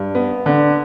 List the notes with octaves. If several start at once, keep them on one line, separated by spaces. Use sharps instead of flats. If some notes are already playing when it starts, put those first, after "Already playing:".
Already playing: G2
B3
D3